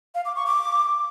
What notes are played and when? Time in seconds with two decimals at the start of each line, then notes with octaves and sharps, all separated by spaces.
0.15 F5
0.25 D6
0.36 C#6
0.46 D6